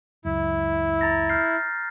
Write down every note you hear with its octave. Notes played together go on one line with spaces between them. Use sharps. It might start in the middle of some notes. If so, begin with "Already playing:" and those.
C#2 F#2 E4
A#5 A6 A#6
F6 G6 C7